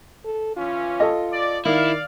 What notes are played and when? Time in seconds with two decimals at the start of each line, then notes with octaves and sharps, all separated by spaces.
0.25 A4
0.57 E3 C#4 F4
1.00 A4 D#5
1.32 D5
1.65 D#3 E4 D5 F5